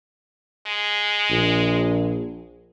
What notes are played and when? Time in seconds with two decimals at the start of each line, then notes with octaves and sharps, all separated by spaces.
0.67 G#3
1.30 A#1